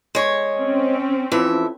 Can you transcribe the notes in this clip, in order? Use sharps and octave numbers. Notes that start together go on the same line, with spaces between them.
G#3 C#5
C4 C#4
F2 E3 E5